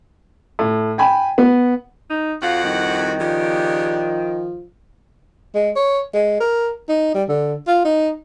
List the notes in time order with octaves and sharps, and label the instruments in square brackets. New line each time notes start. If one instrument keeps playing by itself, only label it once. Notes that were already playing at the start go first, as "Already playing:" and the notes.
[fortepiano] A2
G5 G#5 B5
B3
[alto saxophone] D#4
[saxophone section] F2 F#4 F#5 [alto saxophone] F4
[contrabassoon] C2 [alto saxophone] D#3
[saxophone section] C#3 D4 G4 [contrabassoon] F3
[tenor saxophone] G#3
C#5
G#3
A#4
D#4
G3
D3
F4
D#4